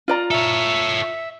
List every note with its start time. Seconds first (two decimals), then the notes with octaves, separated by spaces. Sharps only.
0.08 F4 D5 A#5
0.31 A4 C#5 E5